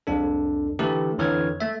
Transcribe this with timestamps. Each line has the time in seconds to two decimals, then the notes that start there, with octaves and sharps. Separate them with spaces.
0.07 C2 F2 D4 A4
0.79 D3 E3 A3 E4 G4 A4
1.18 F2 D3 E3 C#5 F6 G#6
1.60 A3 E5